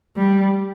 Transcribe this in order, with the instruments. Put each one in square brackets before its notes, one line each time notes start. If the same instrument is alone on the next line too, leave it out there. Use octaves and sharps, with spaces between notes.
[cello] G3